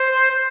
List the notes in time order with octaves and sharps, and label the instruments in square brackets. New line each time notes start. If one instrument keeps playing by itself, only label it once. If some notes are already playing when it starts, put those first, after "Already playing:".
Already playing: [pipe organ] C5